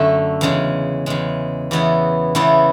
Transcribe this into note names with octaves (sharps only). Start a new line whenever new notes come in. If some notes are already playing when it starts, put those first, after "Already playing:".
Already playing: F#2 D3 A3
E2 C#3 G#3
E2 C#3 G#3
E2 C#3 E3 B3 E4
E2 C#3 E3 B3 E4